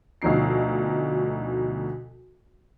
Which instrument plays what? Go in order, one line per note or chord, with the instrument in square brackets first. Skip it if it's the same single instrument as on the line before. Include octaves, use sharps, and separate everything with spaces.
[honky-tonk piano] D2 B2 F3 D#4 C7